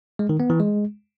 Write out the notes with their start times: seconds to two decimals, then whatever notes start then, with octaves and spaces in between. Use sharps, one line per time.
0.19 G#3
0.29 D#3
0.40 B3
0.50 E3
0.60 G#3